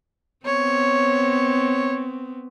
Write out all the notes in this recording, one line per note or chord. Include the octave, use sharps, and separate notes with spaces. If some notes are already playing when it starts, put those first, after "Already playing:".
B3 C4 C#5